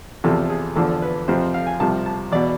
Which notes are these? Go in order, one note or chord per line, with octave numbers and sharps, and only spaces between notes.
E2 C3 F3 A4
G#4
E2 D3 F3 A4
B4
F2 C3 F3 C5
F5
G#5
C2 C3 F3 A5
A5
E2 B2 D5